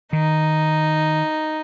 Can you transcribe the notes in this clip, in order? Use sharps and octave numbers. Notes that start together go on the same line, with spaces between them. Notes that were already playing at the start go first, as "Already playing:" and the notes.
D#3 D#4